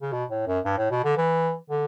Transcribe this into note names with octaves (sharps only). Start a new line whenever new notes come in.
C#3
B2
A2
F#2
G2
A2
B2
D3
E3
D3